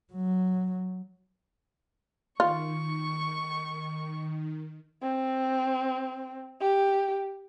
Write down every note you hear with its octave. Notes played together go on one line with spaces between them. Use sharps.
F#3
D#3 F4 C#6
C4
G4